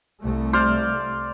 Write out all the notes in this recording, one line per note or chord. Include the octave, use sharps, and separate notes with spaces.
C2 A3
C5 D5 F5